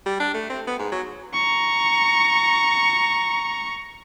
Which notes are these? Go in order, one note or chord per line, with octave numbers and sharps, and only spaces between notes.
G3
D4
A3
C4
B3
G#2
F#3
A#5 C#6